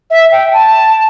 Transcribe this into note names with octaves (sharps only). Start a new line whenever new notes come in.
E5
G5
A5